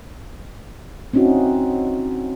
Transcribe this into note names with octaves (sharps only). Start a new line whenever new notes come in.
C4 C#4 D#4 E4 F#4